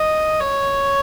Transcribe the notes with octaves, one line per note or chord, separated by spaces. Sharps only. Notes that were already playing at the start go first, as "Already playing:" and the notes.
Already playing: D#5
C#5